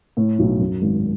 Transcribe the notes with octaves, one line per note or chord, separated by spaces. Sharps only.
A2
B1
F#2
G#1